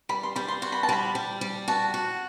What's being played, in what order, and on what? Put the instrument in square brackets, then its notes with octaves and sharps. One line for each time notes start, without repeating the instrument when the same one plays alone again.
[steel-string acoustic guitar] G3 [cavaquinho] B5
[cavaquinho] C6
[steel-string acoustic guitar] G3 [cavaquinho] B5
[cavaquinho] C6
[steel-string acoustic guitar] F#4 [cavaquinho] C6
[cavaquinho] B5
A5
[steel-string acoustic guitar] G3 [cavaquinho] B5
[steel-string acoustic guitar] G3
G3
[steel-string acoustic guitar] F#4 [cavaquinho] A5
[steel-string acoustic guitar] F#4